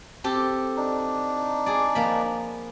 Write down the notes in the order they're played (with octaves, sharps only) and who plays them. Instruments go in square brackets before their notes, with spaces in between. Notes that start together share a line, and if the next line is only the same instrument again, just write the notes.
[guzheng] C4 G4 A4
[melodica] D4 D#4
[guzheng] G#4 D5
F3 A#3 B5